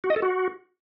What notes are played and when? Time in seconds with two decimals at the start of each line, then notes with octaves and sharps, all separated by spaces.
0.04 F#4
0.10 D#5
0.16 A4
0.22 F#4